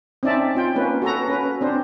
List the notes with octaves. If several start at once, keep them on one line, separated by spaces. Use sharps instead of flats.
C4 C#4 D#4 D5 E5 A5
C4 F4 G5
A#3 C#4 B4
F#4 A4 B4 A#5
C#4 B4
C4 D4 C5